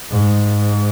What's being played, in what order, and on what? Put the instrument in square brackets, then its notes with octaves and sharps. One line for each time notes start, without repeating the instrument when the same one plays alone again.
[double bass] G#2